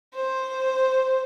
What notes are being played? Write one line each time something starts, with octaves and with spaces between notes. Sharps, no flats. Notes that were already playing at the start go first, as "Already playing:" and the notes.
C5